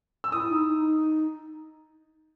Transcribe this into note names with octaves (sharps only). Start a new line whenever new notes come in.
E6
E4 D#6
D#4
D#4